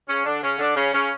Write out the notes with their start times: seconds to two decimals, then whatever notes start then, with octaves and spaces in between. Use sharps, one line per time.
0.09 C#3 C#4
0.25 D3 D4
0.42 C#3 C#4
0.59 D3 D4
0.76 C#3 C#4
0.94 C#3 C#4